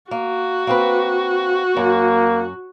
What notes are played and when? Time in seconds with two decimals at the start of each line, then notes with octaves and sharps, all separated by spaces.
0.11 A#3 F#4
0.67 A#3 C4 B4
1.77 F#2 A#3